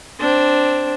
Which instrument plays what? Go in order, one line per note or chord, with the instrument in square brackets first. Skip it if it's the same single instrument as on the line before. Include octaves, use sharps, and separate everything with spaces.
[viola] C4 D4